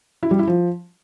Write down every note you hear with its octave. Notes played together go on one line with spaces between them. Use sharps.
E4
G3
E4
F3